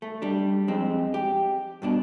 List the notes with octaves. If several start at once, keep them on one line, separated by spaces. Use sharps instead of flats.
A3
G3 D4
F2 G#3 C4
G4
G2 B2 D4